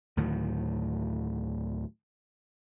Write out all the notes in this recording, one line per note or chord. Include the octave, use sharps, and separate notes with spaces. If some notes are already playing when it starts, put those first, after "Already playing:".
D2 A2 D#3 F#3